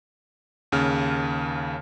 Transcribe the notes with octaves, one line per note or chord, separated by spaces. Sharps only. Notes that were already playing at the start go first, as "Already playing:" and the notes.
D#2 C#3 F6